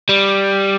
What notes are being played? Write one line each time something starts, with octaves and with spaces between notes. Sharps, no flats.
G3